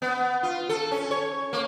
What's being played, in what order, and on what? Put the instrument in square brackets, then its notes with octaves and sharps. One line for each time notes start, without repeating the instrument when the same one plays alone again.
[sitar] B3
F4
A4
C#4
C#5
A#3